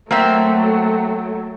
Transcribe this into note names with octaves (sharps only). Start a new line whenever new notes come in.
F#3 A3 A#3 C4 E5